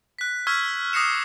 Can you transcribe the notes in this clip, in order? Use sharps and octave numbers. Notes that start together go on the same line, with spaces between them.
F#6 B6
C#6 E6 F6 G#6 B6
D6 D#6 A#6 C7 C#7 E7